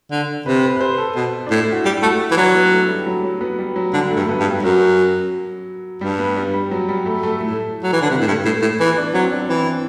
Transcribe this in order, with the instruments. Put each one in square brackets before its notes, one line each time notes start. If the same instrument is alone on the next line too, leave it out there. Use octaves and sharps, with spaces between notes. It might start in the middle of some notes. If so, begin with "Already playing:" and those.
[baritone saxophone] D3
[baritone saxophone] C3 [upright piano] B4
[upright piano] B4
B4
C5
A4
[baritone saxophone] B2
[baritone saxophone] A2 [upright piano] D4
[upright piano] E4
F#4
[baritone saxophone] G3 [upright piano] G4
[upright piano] E4
[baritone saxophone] A3 [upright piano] F#4
[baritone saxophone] E3
[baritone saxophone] F#3 [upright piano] D4
[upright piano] B3
A3
G3
F#3
F#3
B3
G3
F#3
[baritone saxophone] D3 [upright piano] G3
[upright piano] A3
[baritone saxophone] G2
[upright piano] A3
B3
[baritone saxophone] G2
[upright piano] G3
[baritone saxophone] F#2 [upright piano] F#3
[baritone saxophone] G2 [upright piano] G3
[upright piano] B3
G3
G3
F#3
G3
A3
A3
[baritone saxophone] A2 [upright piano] A3
[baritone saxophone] F#3
E3
D3
C3
A2
G2
A2
A2
[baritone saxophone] E3 [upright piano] B3
[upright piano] D4
[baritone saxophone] F#3 [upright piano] C4
[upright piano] D4
[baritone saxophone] E3 [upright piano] C4